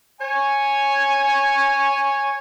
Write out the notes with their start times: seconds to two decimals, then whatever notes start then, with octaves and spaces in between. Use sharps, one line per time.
0.21 C#5 G#5